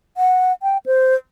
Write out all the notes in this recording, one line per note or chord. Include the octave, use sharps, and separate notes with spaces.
F#5
G5
C5